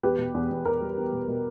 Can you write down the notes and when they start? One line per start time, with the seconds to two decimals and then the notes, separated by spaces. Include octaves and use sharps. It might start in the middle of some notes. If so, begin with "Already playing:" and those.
0.03 E2 G4 B4
0.19 B2
0.34 E2
0.51 E2
0.65 E2 A#4
0.81 G3
0.97 E2
1.13 B2
1.28 B2